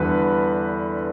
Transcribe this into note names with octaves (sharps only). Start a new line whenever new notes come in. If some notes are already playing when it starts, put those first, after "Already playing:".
Already playing: E2 D3 G3 B4